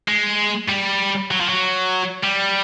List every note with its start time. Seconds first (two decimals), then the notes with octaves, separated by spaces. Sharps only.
0.08 G#3
0.69 G3
1.31 F#3
1.40 F3
1.49 F#3
2.24 G3